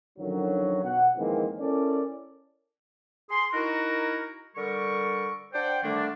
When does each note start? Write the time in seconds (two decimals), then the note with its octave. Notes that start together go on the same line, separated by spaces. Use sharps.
0.19 F#2 D3 D#3 F3 F#3
0.84 B2 F#5
1.17 F2 D#3 E3 G#3 A#3 C4
1.59 C#4 E4 A4 A#4 D5
3.30 G#4 C6
3.53 D#4 E4 F#4 A#4
4.56 D3 G3 A4 A#4 C#6
5.54 D4 C5 D5 F#5 G5
5.83 D3 D#3 G3 A3 A#3 D4